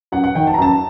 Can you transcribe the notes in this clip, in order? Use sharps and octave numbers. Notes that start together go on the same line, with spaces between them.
F#2 F#5
F#5
D#3 G5
A5
A#5
F#2 A5